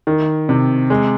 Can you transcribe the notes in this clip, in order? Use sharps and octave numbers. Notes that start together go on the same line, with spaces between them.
D#3
C3
G#3